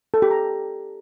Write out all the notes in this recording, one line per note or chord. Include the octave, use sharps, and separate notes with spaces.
A4
G4
A#5